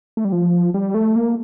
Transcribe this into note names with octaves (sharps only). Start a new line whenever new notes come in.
A3
G3
F3
G3
A3
A#3